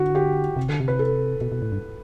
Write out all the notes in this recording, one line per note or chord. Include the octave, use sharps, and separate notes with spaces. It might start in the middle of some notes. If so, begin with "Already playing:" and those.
Already playing: D3 F#4
G4
C3
D3
C3
B4
A4
B2
B2
A2
G2